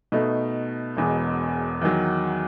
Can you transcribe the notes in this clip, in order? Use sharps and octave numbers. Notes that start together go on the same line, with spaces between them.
B2 A3 D#4
E1 E2 B2 G#3
E2 D#3 F#3